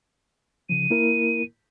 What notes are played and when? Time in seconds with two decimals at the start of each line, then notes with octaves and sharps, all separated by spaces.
0.69 C#3 F3 D#7
0.90 A#3 E4 A#4